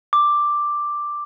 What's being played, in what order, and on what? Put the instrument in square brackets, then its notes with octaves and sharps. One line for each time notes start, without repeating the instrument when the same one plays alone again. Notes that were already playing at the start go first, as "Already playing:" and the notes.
[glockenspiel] D6